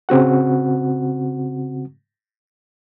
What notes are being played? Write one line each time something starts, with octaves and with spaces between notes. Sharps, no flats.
C#3 C4 F#4 F#5